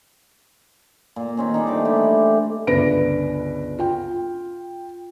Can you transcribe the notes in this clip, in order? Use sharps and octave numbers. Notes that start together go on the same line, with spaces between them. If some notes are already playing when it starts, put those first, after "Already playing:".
A#2
D#3 C4 C#4
G3 C4 D4 D#4
A3 C5 D6
E3 E4 G4
G1 C#2 D4 B4 A#6 D7
F4 G5